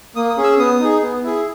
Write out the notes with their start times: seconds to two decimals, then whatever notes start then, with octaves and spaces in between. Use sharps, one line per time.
0.16 A#3 D#6
0.29 D#6
0.37 C#4 G#4
0.44 E6
0.59 B3 D#6
0.80 D#4 G#4
1.02 B3
1.24 E4 G#4